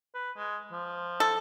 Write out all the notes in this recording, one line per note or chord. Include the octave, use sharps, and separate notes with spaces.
B4
G#3
F3
A4